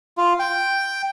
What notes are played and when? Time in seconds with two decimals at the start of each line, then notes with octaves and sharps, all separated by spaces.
0.18 F4
0.39 G5